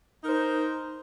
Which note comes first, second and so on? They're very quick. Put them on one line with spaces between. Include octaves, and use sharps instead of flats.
D#4 A#4 C5